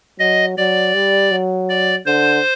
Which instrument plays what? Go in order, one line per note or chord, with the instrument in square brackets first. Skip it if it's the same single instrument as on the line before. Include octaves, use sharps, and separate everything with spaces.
[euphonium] F#3 [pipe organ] D#5
[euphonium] F#3 [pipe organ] D5
[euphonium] G3
F#3
[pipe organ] D5
[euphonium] D3 [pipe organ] C5